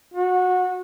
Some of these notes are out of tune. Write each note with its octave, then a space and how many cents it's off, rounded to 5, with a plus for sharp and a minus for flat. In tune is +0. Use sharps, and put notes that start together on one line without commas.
F#4 -20